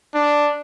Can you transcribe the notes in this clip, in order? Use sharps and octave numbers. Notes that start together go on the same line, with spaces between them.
D4